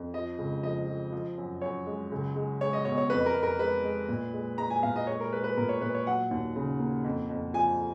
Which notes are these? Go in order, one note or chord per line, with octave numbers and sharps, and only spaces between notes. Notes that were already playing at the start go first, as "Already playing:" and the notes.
Already playing: F2
F3 D#5
C#2
F3 D#5
F3
F3
F#2
F#2 C#5
G#3
C#2
G#3
G#3 C#5
D#5
B2 C#5
C#5
F2 B4
A#4
F2
A#4
G#3 B4
G#3
A#2
G#3
G#3 A#5
G#5
A#2 F5
D#5
G#3 C#5
A#4
G#3 B4
B4
A#2 A#4
C#5
A#2 B4
C#5
F#3 F#5
D#2
C#3
A#3
F2
F2
F3 G#5